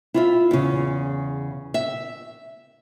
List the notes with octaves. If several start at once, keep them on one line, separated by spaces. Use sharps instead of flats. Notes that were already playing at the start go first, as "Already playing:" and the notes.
E4 F4 E5
E2 C#3
E5